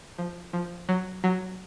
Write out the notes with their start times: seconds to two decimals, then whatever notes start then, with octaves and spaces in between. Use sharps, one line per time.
0.18 F3
0.53 F3
0.89 F#3
1.24 F#3